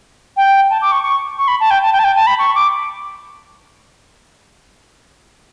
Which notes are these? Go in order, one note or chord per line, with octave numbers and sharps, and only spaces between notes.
G5
A5
D6
C#6
C#6
C#6
B5
A5
G5
A5
G5
A5
G5
A5
B5
C#6
D6